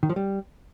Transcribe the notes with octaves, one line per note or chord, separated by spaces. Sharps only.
D#3
F3
G3